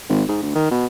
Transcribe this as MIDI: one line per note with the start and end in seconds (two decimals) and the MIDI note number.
0.09 0.23 32
0.28 0.40 44
0.42 0.52 38
0.55 0.71 51
0.71 0.86 47